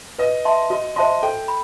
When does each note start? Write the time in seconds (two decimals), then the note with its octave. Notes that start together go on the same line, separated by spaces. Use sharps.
0.19 B4 D#5
0.45 E5 A5 C6
0.70 F#4 D#5
0.96 C5 D#5 E5 A5 C6
1.23 A4 G5
1.48 B5